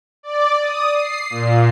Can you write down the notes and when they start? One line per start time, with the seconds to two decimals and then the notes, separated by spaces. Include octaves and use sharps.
0.23 D5
0.61 D#6
0.94 C7
1.30 A#2